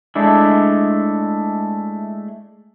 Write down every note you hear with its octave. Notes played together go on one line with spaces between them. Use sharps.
G#3 A3 D4 E4